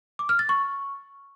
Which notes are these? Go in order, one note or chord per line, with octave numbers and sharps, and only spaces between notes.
D6
F6
A6
C#6